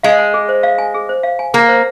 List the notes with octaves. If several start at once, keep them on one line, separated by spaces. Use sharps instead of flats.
G#3 F5
G#5
G#4
C5
F5
G#5
G#4
C5
F5
G#5
A#3 G#4
C5